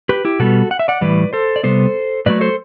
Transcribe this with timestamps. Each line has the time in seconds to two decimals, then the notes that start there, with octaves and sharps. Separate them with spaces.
0.09 G4 B4
0.25 E4 G4
0.39 B2 G3 B3 F#4 A4
0.71 F#5
0.79 E5
0.88 D5 F#5
1.01 A2 E3 G3 B4 D5
1.33 A4 C5
1.56 D5
1.63 C3 G3 B3 A4 C5
2.26 A2 F#3 A3 B4 D5
2.41 A4 C5